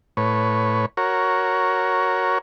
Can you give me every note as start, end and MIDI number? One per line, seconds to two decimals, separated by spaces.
0.17 0.86 45
0.17 0.86 71
0.17 0.86 73
0.97 2.38 66
0.97 2.38 70
0.97 2.38 73